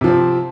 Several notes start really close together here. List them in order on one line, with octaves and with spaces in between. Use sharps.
C3 F3 C4